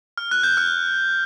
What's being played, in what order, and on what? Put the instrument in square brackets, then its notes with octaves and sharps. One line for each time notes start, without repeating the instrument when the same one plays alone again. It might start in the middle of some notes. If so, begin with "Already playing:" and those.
[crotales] F6
F#6
G6
F6